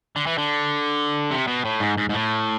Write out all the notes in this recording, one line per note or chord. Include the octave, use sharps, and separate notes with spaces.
D3
E3
D3
C3
B2
A2
G#2
G#2
G#2
A2